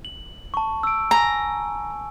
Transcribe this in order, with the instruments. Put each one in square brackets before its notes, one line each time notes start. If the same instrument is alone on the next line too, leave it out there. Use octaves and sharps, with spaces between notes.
[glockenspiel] F#7
A5 C#6
E6 D7
[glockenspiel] G#5 [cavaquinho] A#5